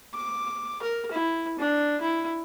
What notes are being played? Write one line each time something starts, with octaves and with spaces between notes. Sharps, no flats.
D6
A#4
E4
D4
E4